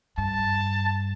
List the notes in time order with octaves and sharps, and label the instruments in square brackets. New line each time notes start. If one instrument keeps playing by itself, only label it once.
[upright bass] G2 [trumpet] A5